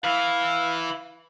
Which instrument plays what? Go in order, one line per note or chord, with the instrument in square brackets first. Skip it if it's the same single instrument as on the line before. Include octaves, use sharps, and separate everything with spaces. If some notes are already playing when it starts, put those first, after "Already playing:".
[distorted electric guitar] E3 E4 [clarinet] F5